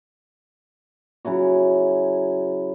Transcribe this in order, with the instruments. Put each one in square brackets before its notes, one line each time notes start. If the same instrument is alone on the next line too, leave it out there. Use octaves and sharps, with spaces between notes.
[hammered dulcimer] C#3 F#3 E4 F#4